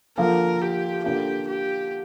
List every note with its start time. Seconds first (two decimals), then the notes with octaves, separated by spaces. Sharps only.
0.18 D3 F3 A#3 F4 A#4
0.61 G4
1.04 D3 A#3 D4 F4 G4
1.47 G4